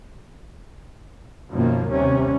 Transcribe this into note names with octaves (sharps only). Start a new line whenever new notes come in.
F#2 B2 D#3 F3 A#3
D#2 C3 G3 C#4